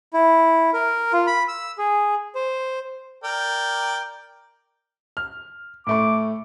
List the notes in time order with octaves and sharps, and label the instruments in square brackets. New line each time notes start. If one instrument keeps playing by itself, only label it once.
[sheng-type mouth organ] E4
A#4
F4
B5
E6
G#4
C5
[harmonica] A#4 D5 G5
[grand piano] F6
[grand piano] A2 A3 C#6 [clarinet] D6